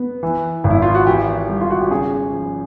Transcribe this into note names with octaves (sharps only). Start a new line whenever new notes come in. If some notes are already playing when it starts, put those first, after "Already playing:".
Already playing: B3
E3
G#1
E4
F4
F#4
E3 G4
G3
F4
F#4
G4
C#3 G#4
F3